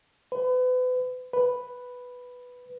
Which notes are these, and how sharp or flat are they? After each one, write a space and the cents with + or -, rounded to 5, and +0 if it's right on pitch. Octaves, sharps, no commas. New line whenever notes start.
B4 +35
B4 +0